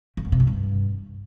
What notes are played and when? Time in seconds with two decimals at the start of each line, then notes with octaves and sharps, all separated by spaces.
0.17 F2
0.25 F#2
0.32 C3
0.40 F#2
0.47 G2